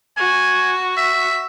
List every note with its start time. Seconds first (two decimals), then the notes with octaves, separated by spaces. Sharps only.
0.17 F#4 G#5
0.97 E5